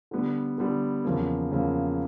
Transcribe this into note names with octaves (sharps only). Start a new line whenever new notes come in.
D3 G3 B3
D3 G3 B3
E2 C#3 F3 A#3
E2 C#3 F3 A#3